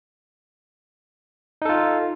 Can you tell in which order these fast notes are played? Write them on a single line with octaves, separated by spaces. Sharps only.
D#4 A4 F4